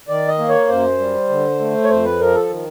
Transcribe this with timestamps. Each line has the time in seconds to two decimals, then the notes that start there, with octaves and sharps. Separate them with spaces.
0.08 D#3 D5
0.28 D#5
0.38 A#3
0.49 C#5
0.69 F#2 C5
0.99 G3
1.29 D3
1.59 A3
1.84 C#5
1.89 F2 C5
2.05 B4
2.20 F3 A#4
2.35 A4
2.50 D#3